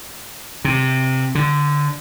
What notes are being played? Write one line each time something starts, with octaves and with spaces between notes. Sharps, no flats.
C3
D3